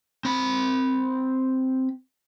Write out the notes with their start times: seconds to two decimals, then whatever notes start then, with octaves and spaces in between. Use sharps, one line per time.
0.25 C4 B5